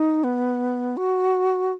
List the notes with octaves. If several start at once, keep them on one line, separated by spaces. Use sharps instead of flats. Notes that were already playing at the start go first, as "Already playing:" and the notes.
Already playing: D#4
B3
F#4